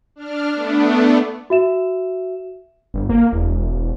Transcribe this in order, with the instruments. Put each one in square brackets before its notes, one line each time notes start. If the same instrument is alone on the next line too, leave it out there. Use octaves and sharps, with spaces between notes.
[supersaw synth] D4 F6
A3 B3 D4
[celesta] F#4 E5 E7
[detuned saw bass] G1
A#3
E1